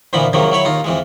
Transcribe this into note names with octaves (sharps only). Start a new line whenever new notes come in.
D2 A#2 E3 F3 B3 B5
G#2 C3 D#3 F3 F#3 A#3
F#3 E4 C#5 B5
D#2 D#4 F4
F2 E3 G#3